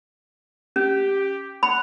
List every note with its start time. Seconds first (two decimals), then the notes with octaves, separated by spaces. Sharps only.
0.76 C#4 G4
1.63 F#5 B5